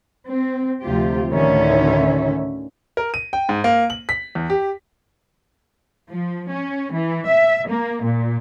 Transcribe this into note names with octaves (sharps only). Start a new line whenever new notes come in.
C4
D2 C3 F3 F4 G4
D2 A2 D3 D#3 C#4 E5
A#4
D#7
G5
G#2
A#3
F#7
B6
E2
G4
F3
C#4
E3
E5
A#3
A#2